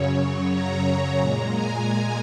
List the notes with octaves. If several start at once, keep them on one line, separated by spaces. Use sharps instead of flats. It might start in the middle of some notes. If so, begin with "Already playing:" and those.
Already playing: F#2 C#3 F#3 C#5
A#5
A#2 G#3 A#5
G#5